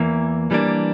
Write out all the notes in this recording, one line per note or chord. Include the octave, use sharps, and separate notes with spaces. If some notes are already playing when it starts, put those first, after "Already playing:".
Already playing: E2 E3 A#3
E3 G3 A#3 D4